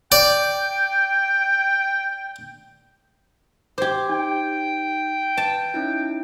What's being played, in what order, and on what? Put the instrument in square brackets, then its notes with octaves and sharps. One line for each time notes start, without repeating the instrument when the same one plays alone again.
[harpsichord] D5 [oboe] G5
[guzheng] G4 C5 [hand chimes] D6 G#6
[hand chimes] D#4 [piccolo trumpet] G5
[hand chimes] B4 [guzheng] A5
[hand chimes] C#4 D#4 E4